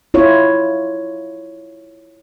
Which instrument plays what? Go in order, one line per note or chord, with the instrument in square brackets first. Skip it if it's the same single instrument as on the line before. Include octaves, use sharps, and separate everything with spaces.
[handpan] E4 F4 C#5